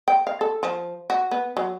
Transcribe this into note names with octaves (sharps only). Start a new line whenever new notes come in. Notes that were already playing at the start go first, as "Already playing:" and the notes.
G5
F5
A4
F3
F#4
B3
F#3